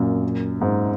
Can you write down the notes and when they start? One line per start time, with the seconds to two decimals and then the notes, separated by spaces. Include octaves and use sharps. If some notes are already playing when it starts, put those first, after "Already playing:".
Already playing: F#2 A#2
0.61 G#2